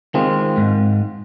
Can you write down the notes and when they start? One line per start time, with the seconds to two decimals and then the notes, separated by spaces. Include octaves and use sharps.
0.14 D#3 G#3 C4 F4
0.57 G#2